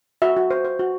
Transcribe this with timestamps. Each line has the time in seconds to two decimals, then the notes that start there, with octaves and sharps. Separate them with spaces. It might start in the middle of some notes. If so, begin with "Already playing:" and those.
0.22 F#4 E5
0.37 F#4
0.51 C5
0.65 C5
0.79 F#4